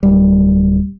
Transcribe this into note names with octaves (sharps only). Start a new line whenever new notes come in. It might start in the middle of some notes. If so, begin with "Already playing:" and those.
D1 G3